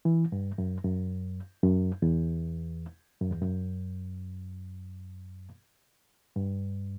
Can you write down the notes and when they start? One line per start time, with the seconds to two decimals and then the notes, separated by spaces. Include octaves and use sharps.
0.05 E3
0.32 G2
0.58 F#2
0.84 F#2
1.63 F#2
2.02 E2
3.21 F#2
3.31 E2
3.42 F#2
6.36 G2